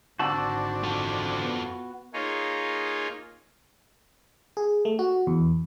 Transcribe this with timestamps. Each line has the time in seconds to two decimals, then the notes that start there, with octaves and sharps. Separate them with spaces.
0.19 G#1 D3 C4 D4 F#4 A5 E6
0.84 F4 A4
1.43 B3
2.13 A#3 D#4 F4 G#4 C#5
4.57 G#4
4.85 A3
4.99 F#4
5.27 E2